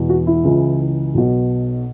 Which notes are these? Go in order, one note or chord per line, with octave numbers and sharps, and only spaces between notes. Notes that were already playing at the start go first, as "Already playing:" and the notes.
Already playing: E1 E2 B2
F#4
E4
C#2 C#3 E3
B1 B2